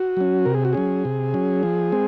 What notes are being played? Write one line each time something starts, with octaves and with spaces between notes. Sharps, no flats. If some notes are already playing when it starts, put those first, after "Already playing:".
Already playing: F#4
F#3 C#4
C3 A#4
G#4
F#4
F#3 C#4 G#4
C3
F#3 C#4
F3
G#3 C4